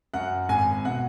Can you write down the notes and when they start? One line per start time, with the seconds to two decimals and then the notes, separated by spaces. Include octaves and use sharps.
0.14 F#2 F#5
0.49 G#1 G#5
0.84 B2 F#5